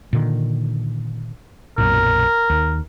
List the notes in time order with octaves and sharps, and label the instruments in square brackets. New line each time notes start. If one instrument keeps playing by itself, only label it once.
[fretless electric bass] A#2 D3 D#3
[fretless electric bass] B1 F#2 A#2 [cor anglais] A#4
[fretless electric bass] D#2